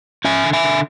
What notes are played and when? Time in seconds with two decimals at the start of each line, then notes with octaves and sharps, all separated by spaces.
0.25 C#4 E5 G#5
0.44 D3
0.53 E5 G#5
0.64 D3